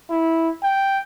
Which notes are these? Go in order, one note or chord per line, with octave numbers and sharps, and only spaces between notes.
E4
G5